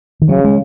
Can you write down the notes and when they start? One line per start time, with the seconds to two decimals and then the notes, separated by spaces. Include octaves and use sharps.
0.22 D#3
0.29 C#3 F#3
0.44 G#3